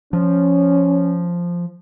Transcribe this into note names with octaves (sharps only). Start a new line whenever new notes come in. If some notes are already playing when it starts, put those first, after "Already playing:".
F3 C#4